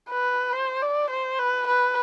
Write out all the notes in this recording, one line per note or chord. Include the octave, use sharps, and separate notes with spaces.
B4
C5
D5
C5
B4
B4